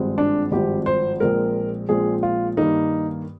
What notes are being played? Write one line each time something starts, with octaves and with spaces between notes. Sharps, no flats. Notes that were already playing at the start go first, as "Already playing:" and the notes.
Already playing: G#1 G2 F3 G#3 C4
D4
G#1 G2 F3 G#3 C4 G4
C5
A#1 A#2 G#3 C4 A#4
A#1 A#2 G#3 C4 G#4
F4
G2 D#3 A#3 D#4